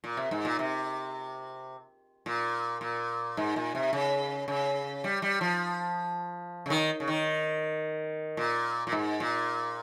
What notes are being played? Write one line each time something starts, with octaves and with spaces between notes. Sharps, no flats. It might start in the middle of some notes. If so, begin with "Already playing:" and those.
A#2
C3
G#2
A#2
C3
A#2
A#2
G#2
A#2
C3
C#3
C#3
G3
G3
F3
C#3
D#3
C#3
D#3
A#2
A#2
G#2
A#2